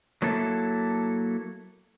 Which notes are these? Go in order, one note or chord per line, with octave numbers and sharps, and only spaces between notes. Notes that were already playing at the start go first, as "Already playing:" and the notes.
F#3 A#3 E4 A4